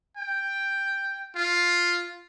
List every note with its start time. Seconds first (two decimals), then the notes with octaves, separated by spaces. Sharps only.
0.17 G5
1.36 F4